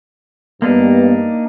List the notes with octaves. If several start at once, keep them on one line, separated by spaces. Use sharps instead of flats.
G2 A#3 B3 D4 D#4